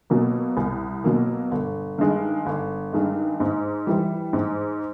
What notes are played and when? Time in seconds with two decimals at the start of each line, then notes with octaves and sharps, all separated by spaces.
0.10 B2 F#3 A#3
0.57 C2
1.04 B2 F#3 A#3
1.51 G1
1.98 G2 D#3 G#3
2.46 G1
2.93 G2 D#3 G#3
3.40 G#2
3.87 E3 G3
4.33 G#2